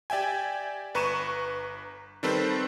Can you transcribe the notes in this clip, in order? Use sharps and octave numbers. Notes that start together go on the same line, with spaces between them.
G4 D5 E5 G5 G#5
G1 B4 A#5 C#6 D#7 E7
D#3 G3 C4 A4 B4 C5